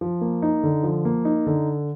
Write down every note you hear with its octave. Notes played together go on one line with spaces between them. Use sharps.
F3
A#3
D#4
D3
F3
A#3
D#4
D3